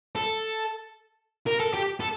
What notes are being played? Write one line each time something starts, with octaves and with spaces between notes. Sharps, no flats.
A4
A#4
A4
G4
A4